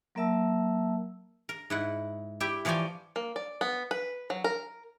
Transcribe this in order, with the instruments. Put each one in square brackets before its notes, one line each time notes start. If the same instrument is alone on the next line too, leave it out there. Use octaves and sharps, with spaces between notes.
[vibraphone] F#3 A#3 A#4 E5 A5 E6
[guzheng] A#4
G#2 E4 F#5
E4 G4 E5 G5
E3 F3 C#5 D5 G5 G#5
[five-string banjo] A#3
D5
B3
B4
F#3
A#4